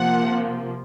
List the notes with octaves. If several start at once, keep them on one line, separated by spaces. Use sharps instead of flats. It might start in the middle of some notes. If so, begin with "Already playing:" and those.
Already playing: C3 F3 A#3 F#5